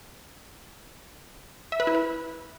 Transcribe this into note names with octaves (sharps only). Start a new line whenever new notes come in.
E5
B4
E4
B4